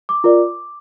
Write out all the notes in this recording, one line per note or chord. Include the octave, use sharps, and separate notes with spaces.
D6
F4 A#4 D5